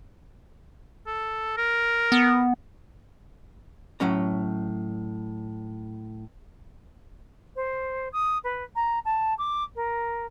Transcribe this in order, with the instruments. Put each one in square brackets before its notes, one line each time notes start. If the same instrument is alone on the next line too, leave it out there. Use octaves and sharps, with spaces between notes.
[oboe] A4
A#4
[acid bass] B3
[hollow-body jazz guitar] A2 F#3 C#4 A#5
[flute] C5
D#6
B4
A#5
A5
D6
A#4